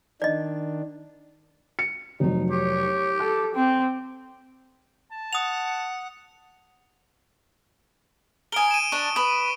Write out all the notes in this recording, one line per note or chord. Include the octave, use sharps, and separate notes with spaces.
D#3 D4 D5 D#5
C#7
F1 F#3 D#4
G4 C#5
A4 D6
C4
A5
F#5 D#6 F7
A#4 G#5 D#6 D7 G7
D#7 E7
D4 C#6 D7
B4 D#6